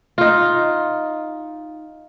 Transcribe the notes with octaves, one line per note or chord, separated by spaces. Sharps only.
D#4 F4